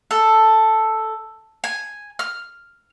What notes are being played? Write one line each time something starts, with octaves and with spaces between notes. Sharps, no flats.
A4
G#5
F6